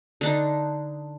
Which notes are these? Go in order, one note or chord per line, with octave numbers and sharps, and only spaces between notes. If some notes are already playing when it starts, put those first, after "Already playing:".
D3 D4 D#4